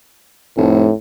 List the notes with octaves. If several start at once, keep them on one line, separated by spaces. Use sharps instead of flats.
F1 A2